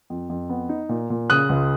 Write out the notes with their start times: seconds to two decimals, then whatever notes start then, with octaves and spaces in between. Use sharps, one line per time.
0.10 F2
0.30 F2
0.50 B3
0.69 D#4
0.89 A#2
1.10 A#2
1.30 C#3 D#6 F#6
1.49 C#2